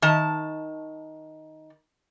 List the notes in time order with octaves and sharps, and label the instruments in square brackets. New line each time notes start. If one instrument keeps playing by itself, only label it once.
[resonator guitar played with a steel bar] D#3 A5